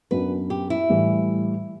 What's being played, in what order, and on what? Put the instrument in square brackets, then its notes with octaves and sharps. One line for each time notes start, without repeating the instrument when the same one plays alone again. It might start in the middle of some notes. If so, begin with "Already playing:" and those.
[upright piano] F#2 F#3 B3 D4 [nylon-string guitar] B4
[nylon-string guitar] G4
E4
[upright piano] A2 E3 G3